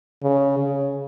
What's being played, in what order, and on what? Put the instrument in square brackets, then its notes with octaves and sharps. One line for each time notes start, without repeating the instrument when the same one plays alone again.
[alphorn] C#3
C#3